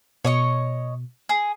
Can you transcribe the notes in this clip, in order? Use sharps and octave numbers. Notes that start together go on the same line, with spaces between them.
B2 C#5 D#5 C#6
G#4